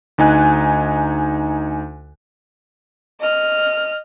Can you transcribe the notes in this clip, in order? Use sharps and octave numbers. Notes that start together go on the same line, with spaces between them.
D2 D#4 G#5 F#6
D#5 F6